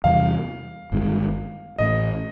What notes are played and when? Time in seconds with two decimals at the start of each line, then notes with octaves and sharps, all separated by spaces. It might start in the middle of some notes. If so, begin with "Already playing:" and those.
0.04 E2 C3 E3 G3 F5
0.92 G1 G2 D#3 G#3
1.78 A1 A2 E3 A3 D#5